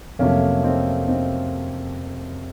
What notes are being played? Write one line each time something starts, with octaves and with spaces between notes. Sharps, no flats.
F2 C3 F#3 A3 A#3 C#4
C4 D#4
C4 D#4